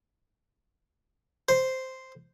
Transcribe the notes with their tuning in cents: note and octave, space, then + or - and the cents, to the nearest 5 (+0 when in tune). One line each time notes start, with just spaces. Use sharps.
C5 -5